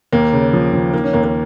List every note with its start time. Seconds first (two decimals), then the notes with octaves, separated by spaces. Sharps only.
0.12 D#2 A#3
0.33 C#3
0.53 F3
0.73 F3
0.93 D#3 A#3
1.04 C#4
1.13 D#2 A#3
1.24 A#3